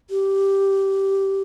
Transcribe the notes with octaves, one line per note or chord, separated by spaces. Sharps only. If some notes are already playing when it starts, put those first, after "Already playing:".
G4